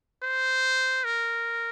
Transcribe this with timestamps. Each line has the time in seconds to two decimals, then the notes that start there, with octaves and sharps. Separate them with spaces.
0.23 C5
1.04 A#4